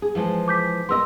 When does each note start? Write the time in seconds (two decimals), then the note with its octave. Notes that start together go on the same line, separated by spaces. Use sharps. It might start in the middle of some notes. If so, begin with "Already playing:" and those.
0.02 G#4
0.15 E3 F3 G#3
0.48 D6 G6 B6
0.89 A#3 A#4 D#5 C6 E6